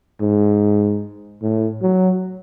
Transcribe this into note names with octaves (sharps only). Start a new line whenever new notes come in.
G#2
A2
F#3